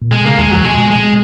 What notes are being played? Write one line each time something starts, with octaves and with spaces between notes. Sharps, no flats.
A#2
B2 G#3
C#3 A#3
D#2 D#3 G#3
F2 F3 F#3
B2 G#3
B2
G#3
B2